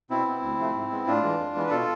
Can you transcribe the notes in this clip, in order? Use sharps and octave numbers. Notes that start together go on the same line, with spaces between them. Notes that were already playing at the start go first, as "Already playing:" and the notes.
B2 C4 E4
B3
D2
C3 F3 A3
G#2
G#3 B3
A2 D4 F4
E3 G#3
F2
E3 G#3 B3
B4
B2 F4 A4